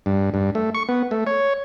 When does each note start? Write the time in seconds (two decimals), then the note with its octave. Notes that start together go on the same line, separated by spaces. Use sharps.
0.06 G2
0.34 G2
0.55 A3
0.75 C#6
0.89 B3
1.11 A3
1.27 C#5